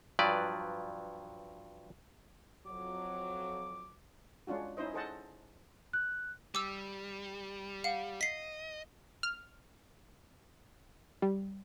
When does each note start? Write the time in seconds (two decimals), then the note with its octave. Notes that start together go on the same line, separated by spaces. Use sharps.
0.19 G2 F3 F#3 B4 D5
2.66 F2 F#3 D6
4.47 G#3 C#4 D4 F4 F#4
4.77 C#4 D#4 E4 C5 D#5
4.94 G#4 A4 C5 D#5 F#5 A5
5.93 F#6
6.55 G3 D6 E6
7.84 F5 F#5
8.21 D#5 B6 C7
9.23 F6
11.22 G3